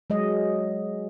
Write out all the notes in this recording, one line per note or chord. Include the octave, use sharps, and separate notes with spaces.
F#3 G#3 D#5